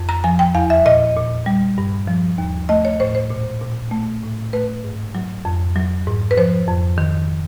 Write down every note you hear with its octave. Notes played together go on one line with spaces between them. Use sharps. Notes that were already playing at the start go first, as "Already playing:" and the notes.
Already playing: F2
A#5
F3 G#5
G5
E2 F5
E5
A#2 D#5
A#2
G3
G2
F3
D#2
A3 D#5
C#5
A2 C5
C5
A#2
A#2
A3
A2
A3 B4
G#2
F#3
F2
F#3
G#2
B4
F3 C5
F2
D#3